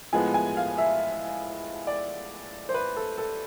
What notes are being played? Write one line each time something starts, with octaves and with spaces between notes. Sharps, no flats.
A2 F3 G#3 B3 G#5
G#5
F5
E5
D5
C5
B4
A4
A4